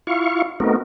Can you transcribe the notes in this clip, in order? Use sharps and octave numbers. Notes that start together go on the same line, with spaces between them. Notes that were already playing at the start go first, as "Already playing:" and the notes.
E4 F4 F5 C#6
A3 B3 C4 D#4 F#4 A#4